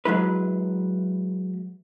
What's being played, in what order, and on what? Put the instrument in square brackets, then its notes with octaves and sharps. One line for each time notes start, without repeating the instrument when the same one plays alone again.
[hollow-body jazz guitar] F#3 G#3 E4 B4